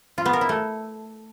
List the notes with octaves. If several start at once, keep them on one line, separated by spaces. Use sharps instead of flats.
F4
B3
A#4
E4
A3